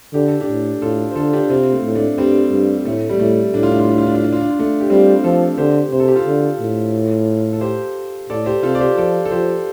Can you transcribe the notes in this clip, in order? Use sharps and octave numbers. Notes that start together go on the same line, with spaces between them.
D3 G4
A4
D4 G4
A2
A2 F4 A4
C5
D3 F4 A4
D4 G4
C3 C4 F4
A3
A2
A3 D4
G2 G3 C4
G2
A2 A3
G3
A2 A3
A2 D4
F4
D4
F4
D4
F4
D4
F4
D4
F4
D4
F4
A3 D4
G4
G3 C4 F4
F3 F4 A4
D3 G4 C5
C3 C5
A4
G4
F4 A4
D3
A2
A4
G4 C5
A2 A4 D5
G4 C5
C3 F4 A4
D5
G4 C5
F3 A4 D5
A4
F3 G4 C5